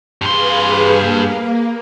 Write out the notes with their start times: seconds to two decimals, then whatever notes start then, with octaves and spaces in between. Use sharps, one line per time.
0.22 G2 G#4 B4 F5 C6
0.98 A#3